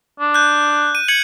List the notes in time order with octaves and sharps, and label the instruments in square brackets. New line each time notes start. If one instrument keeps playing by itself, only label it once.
[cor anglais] D4
[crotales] F#6 G6
D#7
G#6 C#7 F#7